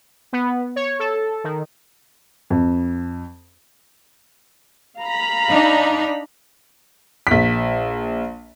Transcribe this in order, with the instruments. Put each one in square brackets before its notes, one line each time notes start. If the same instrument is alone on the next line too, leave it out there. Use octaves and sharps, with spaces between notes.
[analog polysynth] B3
C#5
A4
D#3
[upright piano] F2
[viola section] F5 A#5 B5
[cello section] D4 D#4
[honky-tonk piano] A#1 B6